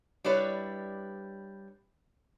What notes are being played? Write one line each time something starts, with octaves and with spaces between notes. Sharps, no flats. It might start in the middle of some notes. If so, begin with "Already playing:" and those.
G3 D4 E4 B4 C#5